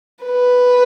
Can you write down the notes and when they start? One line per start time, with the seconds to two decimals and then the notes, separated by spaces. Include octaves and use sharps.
0.24 B4